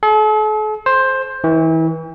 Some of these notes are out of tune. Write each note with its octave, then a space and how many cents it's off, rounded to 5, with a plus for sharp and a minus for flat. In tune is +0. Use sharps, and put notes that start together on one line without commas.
A4 -45
C5 +10
E3 -30